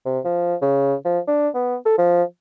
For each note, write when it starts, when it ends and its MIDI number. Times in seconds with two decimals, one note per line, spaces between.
0.05 0.20 48
0.25 0.55 53
0.62 0.94 49
1.05 1.19 53
1.27 1.49 62
1.55 1.75 59
1.86 1.97 69
1.98 2.23 53